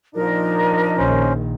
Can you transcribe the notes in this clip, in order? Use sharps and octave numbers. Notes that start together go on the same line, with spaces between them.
A#2 F3 D4 D#4 A#4 D#5
A#1 D#3 C#4 C5